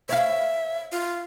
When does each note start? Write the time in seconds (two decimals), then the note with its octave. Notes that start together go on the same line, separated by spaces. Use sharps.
0.09 C#5 E5 F5
0.92 F4